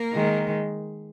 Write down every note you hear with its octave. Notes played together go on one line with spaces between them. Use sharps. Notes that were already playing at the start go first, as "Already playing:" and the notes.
Already playing: A#3 A#4
D#3 G#3